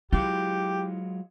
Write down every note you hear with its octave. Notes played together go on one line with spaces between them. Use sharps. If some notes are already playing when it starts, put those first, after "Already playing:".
F#3 G#3 E4 F4 G4